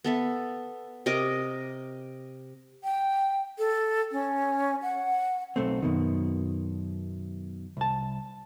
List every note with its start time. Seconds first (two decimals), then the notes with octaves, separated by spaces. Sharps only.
0.04 B3 A4 E5
1.06 C3 A#4 D#5 D6
2.84 G5
3.58 A4
4.12 C#4
4.82 F#5
5.56 B1 A3 C4
5.82 F#2 B2 D#3
7.77 C2 A5